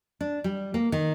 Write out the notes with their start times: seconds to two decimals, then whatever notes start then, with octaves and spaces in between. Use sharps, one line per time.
0.21 D4
0.44 G3
0.74 A#3
0.92 D#3